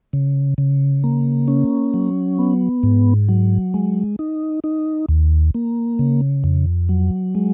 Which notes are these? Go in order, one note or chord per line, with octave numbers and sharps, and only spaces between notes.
C#3
C#3
A#3
C#4
F#3
B3
G#2
F#3
G#3
D#4
D#4
D#2
A#3
C#3
F2
F#3
G#3